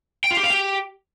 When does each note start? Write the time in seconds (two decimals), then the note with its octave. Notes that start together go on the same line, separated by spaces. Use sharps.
0.24 G5
0.31 F4
0.37 G4
0.44 F5
0.50 G4